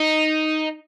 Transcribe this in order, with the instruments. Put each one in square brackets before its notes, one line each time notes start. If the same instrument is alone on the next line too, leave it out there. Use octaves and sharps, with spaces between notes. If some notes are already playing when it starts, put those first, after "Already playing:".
Already playing: [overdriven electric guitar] D#4